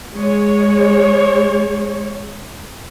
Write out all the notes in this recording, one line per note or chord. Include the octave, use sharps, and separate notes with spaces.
G#3 C#5